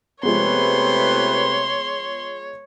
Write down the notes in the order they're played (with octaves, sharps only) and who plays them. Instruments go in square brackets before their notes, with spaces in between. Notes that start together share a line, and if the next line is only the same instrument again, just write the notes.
[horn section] C3 A3 B4 [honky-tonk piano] F3 G#3 B3 [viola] C#5 [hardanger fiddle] C6